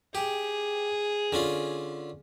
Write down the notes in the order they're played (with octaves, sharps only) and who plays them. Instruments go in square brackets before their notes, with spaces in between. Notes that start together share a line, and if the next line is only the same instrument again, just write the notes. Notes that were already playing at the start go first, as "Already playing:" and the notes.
[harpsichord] G4 [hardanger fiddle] G#4
[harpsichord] D3 C#4 F4